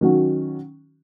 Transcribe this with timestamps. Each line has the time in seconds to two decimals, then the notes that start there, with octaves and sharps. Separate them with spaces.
0.01 D#3 F#3 C#4 F#4